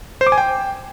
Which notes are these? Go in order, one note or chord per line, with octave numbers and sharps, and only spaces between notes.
C5
D6
G#5
G5